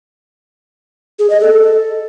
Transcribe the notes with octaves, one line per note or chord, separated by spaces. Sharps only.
G#4
D#5
A4